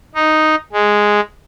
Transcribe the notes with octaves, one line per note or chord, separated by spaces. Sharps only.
D#4
G#3